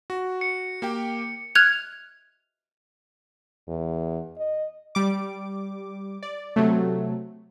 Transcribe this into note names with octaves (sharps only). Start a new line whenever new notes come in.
F#4
C#7
A#3 G4 G5
F6 F#6 G#6 F7
E2
D#5
G3 D6
D5
C3 F#3 A3